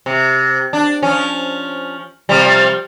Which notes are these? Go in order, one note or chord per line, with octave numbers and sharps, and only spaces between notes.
C3
D4
F3 C#4
C3 F3 G3